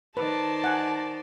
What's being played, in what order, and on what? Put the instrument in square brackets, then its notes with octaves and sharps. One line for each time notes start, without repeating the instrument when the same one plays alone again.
[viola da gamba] D#3 C5 D5 [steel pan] B4 [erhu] A5
[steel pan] F#5 G#5